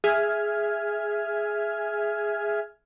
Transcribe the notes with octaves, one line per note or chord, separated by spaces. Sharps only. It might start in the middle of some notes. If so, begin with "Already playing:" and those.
G#4 E5 G#5 F6 G#6